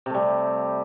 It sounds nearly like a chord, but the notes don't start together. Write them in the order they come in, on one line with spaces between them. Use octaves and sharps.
C3 A3 G3